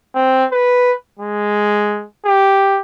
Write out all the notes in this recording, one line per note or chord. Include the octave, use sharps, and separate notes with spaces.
C4
B4
G#3
G4